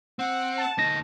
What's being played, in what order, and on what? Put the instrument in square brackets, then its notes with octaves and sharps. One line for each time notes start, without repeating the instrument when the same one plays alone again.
[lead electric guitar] C4 [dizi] F#5
[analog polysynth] A5
[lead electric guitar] D2 D#4 [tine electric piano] A#6